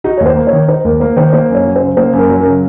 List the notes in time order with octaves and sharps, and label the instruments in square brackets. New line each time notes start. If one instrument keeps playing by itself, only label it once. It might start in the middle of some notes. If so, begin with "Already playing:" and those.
[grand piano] D#4 [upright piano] F#4
[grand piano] D#2 [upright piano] C#5
[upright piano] C5
[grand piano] A#3
[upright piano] C#5
[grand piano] D#3
[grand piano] D#4 [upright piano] C5
[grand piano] D#2 [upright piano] A#4
[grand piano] A#3 [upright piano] C5
[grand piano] D#3 [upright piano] C5
[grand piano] A#3 [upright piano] C5
[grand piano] F#2
[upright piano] C#5
[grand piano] F#3
[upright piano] C5
[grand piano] C#3
[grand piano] A#3 [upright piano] C5
[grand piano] F#2 [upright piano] A#4
[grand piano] F#3
[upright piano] A#4
[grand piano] C#3